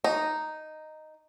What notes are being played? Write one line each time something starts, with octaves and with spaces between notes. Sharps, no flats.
D#4